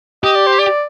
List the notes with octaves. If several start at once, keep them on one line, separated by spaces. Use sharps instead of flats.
G4 D#5
D5
C5
D5